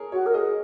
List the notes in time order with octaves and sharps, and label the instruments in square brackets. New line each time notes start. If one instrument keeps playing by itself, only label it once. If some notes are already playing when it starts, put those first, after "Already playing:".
Already playing: [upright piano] G#4 A#4 C#5
[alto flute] F#4 [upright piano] C#5
[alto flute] A#4
[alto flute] G#4 [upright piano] D#5